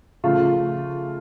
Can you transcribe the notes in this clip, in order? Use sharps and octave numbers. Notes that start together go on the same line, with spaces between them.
C#3 F3 A3 F4